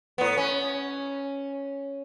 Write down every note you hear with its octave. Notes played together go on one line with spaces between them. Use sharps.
A2 B3
C#4